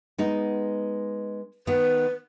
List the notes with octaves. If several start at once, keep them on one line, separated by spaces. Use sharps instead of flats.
G#3 B3 D#4
D#3 B3 B4